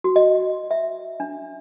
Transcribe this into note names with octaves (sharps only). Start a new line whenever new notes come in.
F#4
D#5
E5
D4